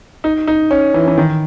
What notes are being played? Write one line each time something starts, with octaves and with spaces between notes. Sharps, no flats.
D#4
D#4
C#4
E3
E3
D#3